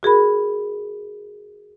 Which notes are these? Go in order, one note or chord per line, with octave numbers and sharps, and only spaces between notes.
F#4 G#4 A#4 B5